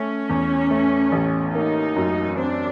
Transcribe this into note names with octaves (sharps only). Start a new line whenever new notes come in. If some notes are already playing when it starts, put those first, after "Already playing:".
Already playing: A3 C#4
E2
A3
A1
A#3 D#4
F#2
C4 D4